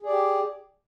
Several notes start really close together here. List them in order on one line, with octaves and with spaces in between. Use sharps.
G#4 D5 G4